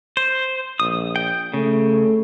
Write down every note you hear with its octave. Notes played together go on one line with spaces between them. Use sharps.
C5
A#1 D#6
G5
C#3 A3